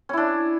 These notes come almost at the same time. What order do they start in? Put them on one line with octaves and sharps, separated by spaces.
C#4 E4 D4